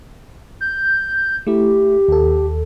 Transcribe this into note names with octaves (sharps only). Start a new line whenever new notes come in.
G6
A3 E4 G4
D#2 A4